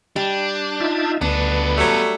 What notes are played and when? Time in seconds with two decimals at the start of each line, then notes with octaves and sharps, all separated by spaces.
0.16 G3 D4
0.80 D#4 F4 E5
1.21 D2 B3 D4 A4 B4
1.78 F#3 G3 A3